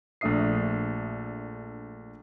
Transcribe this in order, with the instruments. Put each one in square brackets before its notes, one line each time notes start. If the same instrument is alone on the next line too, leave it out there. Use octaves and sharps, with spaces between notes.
[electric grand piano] A#1 A3 D4 E5 D#6 C7